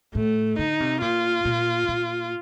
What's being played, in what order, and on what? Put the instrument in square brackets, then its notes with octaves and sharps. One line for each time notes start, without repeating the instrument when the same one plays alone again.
[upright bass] A2 [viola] A3
[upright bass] D3 [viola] D#4
[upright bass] C3
[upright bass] A#2 [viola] F4
[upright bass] A#2
A#2